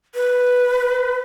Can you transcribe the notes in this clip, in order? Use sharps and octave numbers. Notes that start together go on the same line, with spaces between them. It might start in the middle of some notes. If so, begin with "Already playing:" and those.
B4